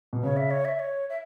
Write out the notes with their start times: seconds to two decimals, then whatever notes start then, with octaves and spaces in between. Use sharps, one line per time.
0.13 B2
0.23 C#3 C#5
0.37 E5
0.51 C#5
0.65 E5
0.79 C#5
1.10 E5